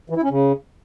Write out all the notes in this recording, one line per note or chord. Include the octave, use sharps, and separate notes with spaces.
E3
E4
C#4
C#3